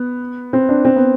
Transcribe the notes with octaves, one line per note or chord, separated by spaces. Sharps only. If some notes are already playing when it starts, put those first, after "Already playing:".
Already playing: B3
C4
D4
C4
B3